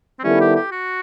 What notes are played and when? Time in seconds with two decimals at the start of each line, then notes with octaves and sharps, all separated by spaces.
0.19 C4
0.24 D#3 G3 B3 C#4 E4 A4
0.40 G4
0.55 G4
0.71 F#4